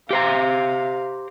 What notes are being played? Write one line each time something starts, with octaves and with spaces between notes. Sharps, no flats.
G4 C5 F5 A#5